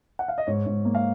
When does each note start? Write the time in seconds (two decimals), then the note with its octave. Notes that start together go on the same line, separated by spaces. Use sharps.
0.19 F#5
0.28 F5
0.38 D#5
0.47 G#2 C#5
0.66 G#2
0.85 A#3
0.95 F5